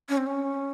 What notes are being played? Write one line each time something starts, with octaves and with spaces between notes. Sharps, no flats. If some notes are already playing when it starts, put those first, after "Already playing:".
C#4
C4
C#4